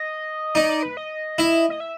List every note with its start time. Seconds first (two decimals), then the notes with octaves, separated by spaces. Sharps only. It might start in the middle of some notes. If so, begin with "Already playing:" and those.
Already playing: D#5
0.55 D#4 D5
0.69 D5
0.83 B4
0.97 D#5
1.38 E4
1.70 D#5
1.80 E5